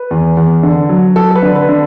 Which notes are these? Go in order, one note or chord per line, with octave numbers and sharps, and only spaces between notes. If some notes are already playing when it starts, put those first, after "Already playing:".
Already playing: B4
E2
E2
D3
F#3
F#3 A4
A4
B4
D3
B4
D3